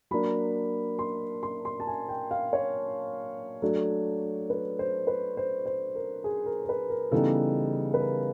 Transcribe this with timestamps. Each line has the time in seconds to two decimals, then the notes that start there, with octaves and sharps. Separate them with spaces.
0.11 F#3 A#3 D4 B5
0.99 C6
1.43 C6
1.65 C6
1.80 A5
1.87 G#5
2.08 G5
2.31 F5
2.53 C#5
3.62 F#3 A3 D4
4.50 B4
4.79 C5
5.07 B4
5.37 C5
5.66 C5
5.95 A#4
6.24 G#4
6.46 A#4
6.65 A#4
6.69 B4
6.90 A#4
7.12 C#3 E3 G3 B3 D#4 A4
7.94 B4
8.00 A#4